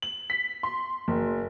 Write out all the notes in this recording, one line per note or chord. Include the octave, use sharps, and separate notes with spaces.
F#7
B6
C6
F#1